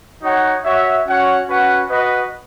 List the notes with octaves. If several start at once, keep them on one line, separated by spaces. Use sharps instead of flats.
D#4 F#4 C#5 F#5
F#4 C#5 E5
C#4 F#4 C#5 F#5
C#4 F#4 B4 F#5
F#4 B4 D#5